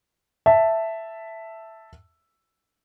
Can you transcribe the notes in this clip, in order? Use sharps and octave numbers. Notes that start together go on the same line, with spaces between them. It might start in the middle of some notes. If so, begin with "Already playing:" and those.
E5 A5